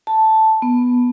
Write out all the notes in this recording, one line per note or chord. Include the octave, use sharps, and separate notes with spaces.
A5
B3